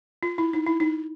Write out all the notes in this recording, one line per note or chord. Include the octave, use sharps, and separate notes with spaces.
F4
E4
D#4
E4
D#4